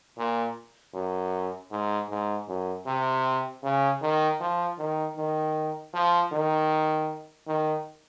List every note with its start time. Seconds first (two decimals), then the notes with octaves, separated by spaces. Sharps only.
0.18 A#2
0.94 F#2
1.72 G#2
2.10 G#2
2.48 F#2
2.87 C3
3.63 C#3
4.02 D#3
4.41 F3
4.78 D#3
5.17 D#3
5.94 F3
6.32 D#3
7.47 D#3